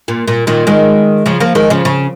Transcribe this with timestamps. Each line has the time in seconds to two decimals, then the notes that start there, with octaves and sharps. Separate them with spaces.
0.08 A#2
0.28 A#2
0.47 A#2 D#3
0.67 D#3 G#3
1.26 C#3 F3
1.40 F3 A#3
1.55 D#3 G#3
1.70 C#3 F3
1.85 C#3